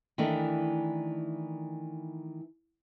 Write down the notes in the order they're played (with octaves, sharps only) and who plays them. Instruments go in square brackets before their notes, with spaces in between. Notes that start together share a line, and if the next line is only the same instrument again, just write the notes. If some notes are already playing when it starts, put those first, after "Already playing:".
[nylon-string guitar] D#3 E3 A3 D4